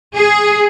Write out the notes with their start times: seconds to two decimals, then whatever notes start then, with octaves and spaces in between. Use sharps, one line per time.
0.17 G#4